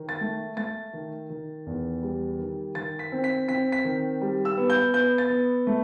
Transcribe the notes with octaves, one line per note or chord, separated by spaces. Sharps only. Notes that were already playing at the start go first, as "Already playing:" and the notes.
Already playing: D#3
A6
A3
A3 A6
D#3
D#3
E2
G3
D#3
D#3 A6
B6
C4
B6
C4 B6
B6
D#3
G3
E6
B3
G6
B3 G6
A6
B3
A3